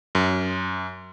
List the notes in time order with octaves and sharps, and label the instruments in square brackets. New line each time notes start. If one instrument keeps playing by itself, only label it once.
[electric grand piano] F#2